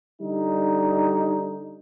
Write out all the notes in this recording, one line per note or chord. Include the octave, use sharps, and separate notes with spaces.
D3 G3 D#4